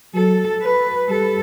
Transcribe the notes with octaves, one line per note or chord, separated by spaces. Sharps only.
F#3 A4
B4
G3 A4